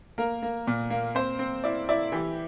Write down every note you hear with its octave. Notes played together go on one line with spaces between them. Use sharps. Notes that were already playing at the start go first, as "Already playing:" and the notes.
A#3 A#4
A#3
A#2
A#3
C4 C5
C4
E4 D5
E4 D5
E3 G4